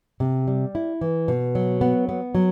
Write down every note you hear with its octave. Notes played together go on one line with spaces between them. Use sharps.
C3
G3
E4
E3
B2
F#3
B3
B3
F#3